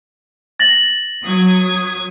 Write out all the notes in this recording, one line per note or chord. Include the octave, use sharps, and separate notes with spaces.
A6 A#6 F#7
F#3 D#6 G#6